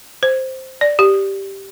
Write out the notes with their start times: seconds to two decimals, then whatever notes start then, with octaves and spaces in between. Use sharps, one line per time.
0.23 C5
0.81 D5
0.99 G4